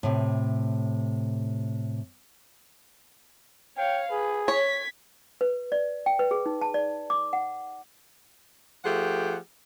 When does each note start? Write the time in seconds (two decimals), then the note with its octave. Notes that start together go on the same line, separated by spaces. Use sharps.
0.03 A2 C3
3.77 C#5 F5 G5
4.11 G#4 B4
4.48 C#5 G#6 B6
5.41 B4
5.72 D5
6.06 G5
6.19 B4
6.31 G#4
6.46 D#4
6.61 A5
6.74 D5
7.10 D6
7.33 F#5
8.85 F3 A3 G4 G#4 F#5